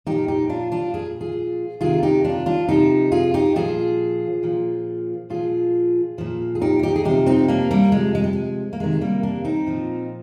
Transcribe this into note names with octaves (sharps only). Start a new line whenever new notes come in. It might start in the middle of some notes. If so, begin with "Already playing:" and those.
A#2 F3 D#4 G4
D#4 G4
D4 F4
D4 F4
A#2 F3 G#4
F4 G#4
C3 D#3 F4 G#4
D#4 G4
D4 F4
D4 F4
C3 F3 D#4 G4
F4 G#4
D#4 G4
A#2 F3 F4 G#4
A#2 F3
A#2 F3 F4 G#4
A#2 F3
G#4
D#4 G4
F4
D#4 G4
G#4
C3 F3 D#4 G4
C4 D#4
A#3 D4
G3 A#3
C3 F3 G#3
G#3
G3
G#3
A#3
C3 D#3 G#3
G3 A#3
A#3 D4
C4 D#4
A#2 F3